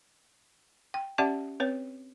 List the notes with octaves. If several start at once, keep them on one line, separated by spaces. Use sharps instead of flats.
G5
C#4 G4 D5 E5 F#5 A5
C4 B4 C#5